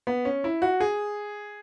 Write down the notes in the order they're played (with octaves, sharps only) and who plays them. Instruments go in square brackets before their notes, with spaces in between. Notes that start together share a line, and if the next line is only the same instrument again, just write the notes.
[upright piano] B3
C#4
E4
F#4
G#4